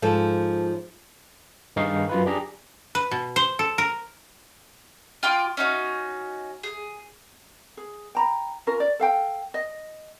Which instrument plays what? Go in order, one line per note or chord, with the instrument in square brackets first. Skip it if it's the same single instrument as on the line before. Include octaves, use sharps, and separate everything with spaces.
[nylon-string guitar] G#2 F3 A4
[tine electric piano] G2 D#3 D#4 G#4 F5 C#6
F#2 F4 B4
D4 G4 G#4 A#5
[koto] B4
B2
C5
A4
A#4
[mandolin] F4 G5 C6 D6
C#4 D#4 F#4
G#4
[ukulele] G#4
G5 A#5 B5
C#4 F4 A#4
D5
A4 F5 G5
D#5